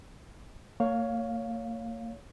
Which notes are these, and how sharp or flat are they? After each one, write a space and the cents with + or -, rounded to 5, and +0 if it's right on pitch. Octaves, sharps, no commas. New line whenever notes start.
A#3 -40 C#5 +10 F5 +10